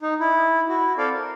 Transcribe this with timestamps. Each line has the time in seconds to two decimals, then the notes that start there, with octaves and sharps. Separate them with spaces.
0.01 D#4
0.20 E4
0.69 E4 F#4
0.98 C4 A4 D5 F5
1.14 A#4